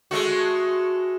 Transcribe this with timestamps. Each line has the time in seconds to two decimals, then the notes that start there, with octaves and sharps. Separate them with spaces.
0.11 G#3 A3 F#4